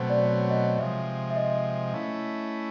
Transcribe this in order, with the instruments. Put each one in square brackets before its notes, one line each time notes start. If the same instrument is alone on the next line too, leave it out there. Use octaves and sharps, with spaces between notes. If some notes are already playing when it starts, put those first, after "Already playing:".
Already playing: [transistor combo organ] B2 F#3 A3 C4 [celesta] C5
[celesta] D5
C#5
D#5
[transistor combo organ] C3 F3 G#3 [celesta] E5
[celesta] E5
D#5
[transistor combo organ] A3 C#4 E4